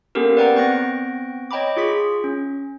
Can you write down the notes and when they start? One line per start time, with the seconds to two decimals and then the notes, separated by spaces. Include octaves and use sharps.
0.15 A#3 B3 C#4 G4 A4 A#4
0.37 B4 D5 F#5 G5 A#5
0.55 B3 C4 G5 C#6 F#6 A#6
1.51 C#5 D#5 G5 A#5 B5 D6
1.77 F4 G#4 C#6 B6
2.24 C#4